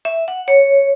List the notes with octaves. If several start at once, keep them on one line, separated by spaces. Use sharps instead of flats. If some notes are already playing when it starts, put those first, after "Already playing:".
E5
F#5
C#5